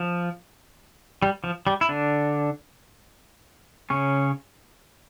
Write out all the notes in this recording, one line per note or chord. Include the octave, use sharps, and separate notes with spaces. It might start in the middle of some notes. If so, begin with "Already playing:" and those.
Already playing: F3
G3
F3
G3
E4
D3 D4
C#3 C#4